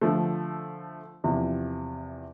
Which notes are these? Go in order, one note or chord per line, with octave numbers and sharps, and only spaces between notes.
D3 F3 A3
E2 C3 F3